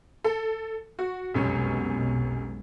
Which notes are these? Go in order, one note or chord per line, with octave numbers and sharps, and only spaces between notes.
A4
F#4
F1 B1 F#2 B2 G#3 C#4